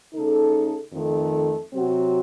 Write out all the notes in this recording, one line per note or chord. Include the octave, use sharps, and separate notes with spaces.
C#3 A3 D#4 A4
F2 D#3 A3
C3 F#3 C4 F#4